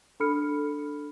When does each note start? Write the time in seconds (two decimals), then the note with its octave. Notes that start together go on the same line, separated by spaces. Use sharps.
0.20 D4 A4 B5 F6 C#7